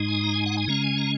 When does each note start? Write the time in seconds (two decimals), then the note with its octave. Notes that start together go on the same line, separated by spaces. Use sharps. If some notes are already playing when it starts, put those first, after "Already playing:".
Already playing: G#2 G#3 D#4
0.08 G#5
0.24 A#5
0.34 G#5
0.46 F#5
0.57 G#5
0.68 C#3 G#3 C#4 A#5
0.84 G#5
0.98 A#5